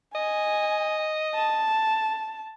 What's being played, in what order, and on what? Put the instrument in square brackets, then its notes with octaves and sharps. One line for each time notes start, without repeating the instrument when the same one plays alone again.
[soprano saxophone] D#5 [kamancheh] G#5
[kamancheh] A5